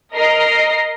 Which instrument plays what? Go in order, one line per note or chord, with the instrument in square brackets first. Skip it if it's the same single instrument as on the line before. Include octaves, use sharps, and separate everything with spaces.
[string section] A#4 D#5 C7